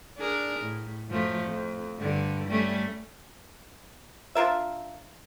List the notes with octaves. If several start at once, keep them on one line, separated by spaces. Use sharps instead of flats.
D4 G#4 A#4
A2
F#2 F3 A3
F2
G2 D3
G3 A3 C#4
D4 F4 A#4 E5